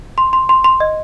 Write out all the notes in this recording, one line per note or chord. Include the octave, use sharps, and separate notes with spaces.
C6
C6
C6
C6
D#5